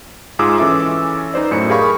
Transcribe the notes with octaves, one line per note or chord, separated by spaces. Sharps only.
G#2 F4 G#4 D6 E6
E3 C#4 A4 E5 D6
D#4 B4 C5 D5
F#2 A2 C#7
G4 G#4 A#4 F5 B5 C#6